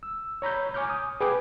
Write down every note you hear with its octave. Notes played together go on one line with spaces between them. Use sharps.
E6
C#5 A#5 B5 G6
G#5 C#6 D6 F6 G6
D#6
G#4 B4 G5 B5 D6